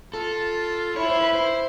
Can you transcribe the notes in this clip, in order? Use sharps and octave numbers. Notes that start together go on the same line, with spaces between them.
F4 A4
E4 C#5
C5
B4
C5